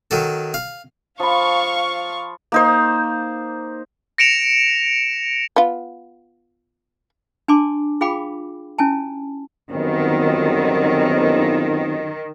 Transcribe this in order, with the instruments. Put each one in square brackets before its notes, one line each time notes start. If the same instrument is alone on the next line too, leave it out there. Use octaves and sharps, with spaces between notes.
[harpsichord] D#3 F#3 A4
F5
[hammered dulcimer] F3 B5 [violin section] F5 C#6
[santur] A#3 D#4 C5
[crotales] A#6 C#7 D7 E7 F7
[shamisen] B3 F4
[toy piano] D4 G#5 A5 C6 D6
F4 G#4 F5 G5 B5 D6
C#4 E4 G#5 A5
[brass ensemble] G1 F#2 [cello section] D#3 [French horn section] B3 C4